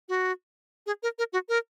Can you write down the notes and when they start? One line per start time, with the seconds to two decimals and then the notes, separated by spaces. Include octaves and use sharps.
0.09 F#4
0.86 G#4
1.03 A#4
1.19 A#4
1.33 F#4
1.49 A#4